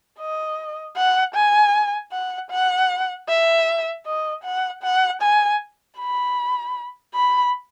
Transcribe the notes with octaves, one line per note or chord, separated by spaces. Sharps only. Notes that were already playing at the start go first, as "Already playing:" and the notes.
D#5
F#5
G#5
F#5
F#5
E5
D#5
F#5
F#5
G#5
B5
B5